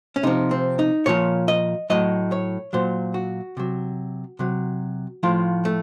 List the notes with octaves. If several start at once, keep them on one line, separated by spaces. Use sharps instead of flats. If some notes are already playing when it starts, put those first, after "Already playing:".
C#4
C3 F3 D#4
C4
D#4
A#2 F3 C#5
D#5
A2 F#3 D#5
C#5
A#2 F#3 C5
F#4
C3 F#3
C3 F#3
A2 F3 F4
A3